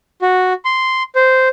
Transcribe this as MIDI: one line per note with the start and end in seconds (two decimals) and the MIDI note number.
0.22 0.53 66
0.65 1.03 84
1.15 1.48 72